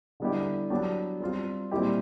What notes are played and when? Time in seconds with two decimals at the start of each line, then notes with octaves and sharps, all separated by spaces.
0.20 D3 G3 B3 E4 G4
0.70 F#3 B3 D4 G4
1.20 G3 C4 F4
1.71 A#2 G3 C4 E4 G4